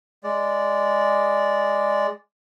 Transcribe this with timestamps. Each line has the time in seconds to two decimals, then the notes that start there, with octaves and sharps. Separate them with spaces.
0.24 G#3 D5